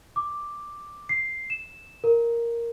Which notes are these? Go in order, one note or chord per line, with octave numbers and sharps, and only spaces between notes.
D6
C7
E7
A#4